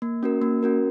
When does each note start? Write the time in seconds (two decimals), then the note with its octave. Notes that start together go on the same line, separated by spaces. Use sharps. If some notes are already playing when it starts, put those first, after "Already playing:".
0.02 A#3
0.23 C#4 F#4 A#4
0.42 A#3
0.63 C#4 F#4 A#4